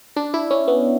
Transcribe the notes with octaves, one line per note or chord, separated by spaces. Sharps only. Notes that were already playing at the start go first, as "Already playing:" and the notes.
D4
E4
C#4
B3